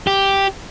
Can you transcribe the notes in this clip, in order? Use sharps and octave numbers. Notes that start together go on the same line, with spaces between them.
G4